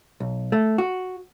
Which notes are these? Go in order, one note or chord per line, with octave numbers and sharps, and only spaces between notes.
B1
A3
F#4